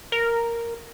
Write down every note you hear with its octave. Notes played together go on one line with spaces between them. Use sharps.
A#4